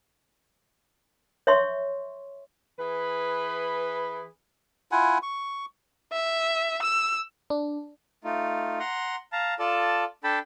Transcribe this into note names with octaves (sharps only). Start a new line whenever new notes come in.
C#5 E5 C6 C#6
E3 G#4 B4
E4 F4 F#5 G#5
C#6
E5
E6
D4
A3 D#4 F4
F#5 A#5 C6
F5 A5 A#5
F4 A4 D5 A5
D4 A4 G5 A5 B5